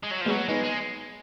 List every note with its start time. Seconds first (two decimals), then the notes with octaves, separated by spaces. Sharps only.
0.03 G#3
0.11 F#3
0.21 F3
0.25 G#3 B3
0.29 F#3
0.48 G#3 B3 D#4
0.63 G#3